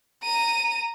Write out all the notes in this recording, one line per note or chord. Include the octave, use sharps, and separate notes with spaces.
A#5 D#7